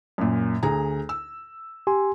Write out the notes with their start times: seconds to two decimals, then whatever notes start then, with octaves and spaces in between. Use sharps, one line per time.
0.18 F#2 A#2
0.63 D2 G#4 A#5
1.09 E6
1.87 G4 G#5 C6